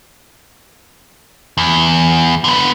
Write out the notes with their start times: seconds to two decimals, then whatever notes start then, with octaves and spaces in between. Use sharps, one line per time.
1.57 E2
2.44 D3 B3